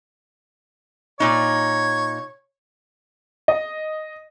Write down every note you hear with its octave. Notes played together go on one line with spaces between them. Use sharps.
A#2 D#4 C#5
D#5